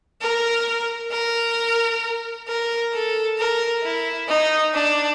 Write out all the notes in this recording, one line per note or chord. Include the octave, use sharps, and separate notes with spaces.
A#4
A#4
A#4
A4
A#4
E4
D#4
D4